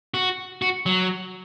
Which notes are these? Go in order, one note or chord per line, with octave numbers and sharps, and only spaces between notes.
F#4
F#4
F#3